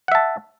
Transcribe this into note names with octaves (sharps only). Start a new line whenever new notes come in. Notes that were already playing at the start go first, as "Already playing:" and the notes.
E5 F#5 A5